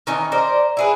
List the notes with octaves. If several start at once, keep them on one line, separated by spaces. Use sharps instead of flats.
D#3 E3 C#4 D#4
A#4 C5 D5
E4 G#4 B4